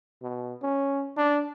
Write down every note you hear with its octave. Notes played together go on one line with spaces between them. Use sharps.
B2
C#4
D4